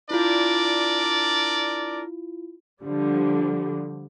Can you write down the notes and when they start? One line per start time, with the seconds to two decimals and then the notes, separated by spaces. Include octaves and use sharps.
0.11 D4 E4 F4 A#4 D5
2.83 D3 F3 G3